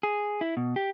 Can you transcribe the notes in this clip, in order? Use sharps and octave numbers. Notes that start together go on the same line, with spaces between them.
G#4
E4
B2
G4